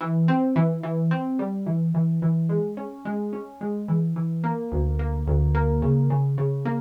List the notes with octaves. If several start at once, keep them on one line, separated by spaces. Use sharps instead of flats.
E3
C4
E3
E3
C4
G3
E3
E3
E3
G#3
C#4
G#3
C#4
G#3
E3
E3
A#3
D2
A#3
D2
A#3
C#3
C#3
C#3
A#3